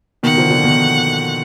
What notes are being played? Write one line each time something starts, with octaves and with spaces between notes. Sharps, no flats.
B2 D#3 F#5
D3 F3
D3 F3
B2 D#3